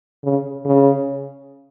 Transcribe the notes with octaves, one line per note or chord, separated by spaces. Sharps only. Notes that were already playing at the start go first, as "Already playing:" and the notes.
C#3
C#3